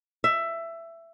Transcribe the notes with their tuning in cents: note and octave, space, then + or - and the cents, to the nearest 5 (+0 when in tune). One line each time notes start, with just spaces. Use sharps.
E5 +15